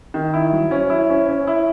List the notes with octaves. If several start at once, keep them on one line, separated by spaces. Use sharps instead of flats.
D#3
E4
F#3
C#4
E4
C#4
C#4
E4